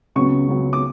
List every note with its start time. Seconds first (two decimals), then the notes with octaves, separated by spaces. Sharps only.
0.15 C#2 C#3 F#3 B3 C#6
0.48 C#2 C#3 F#3 B3
0.73 D6